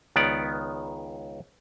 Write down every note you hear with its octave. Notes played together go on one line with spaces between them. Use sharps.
C#2 D#3 B3 D5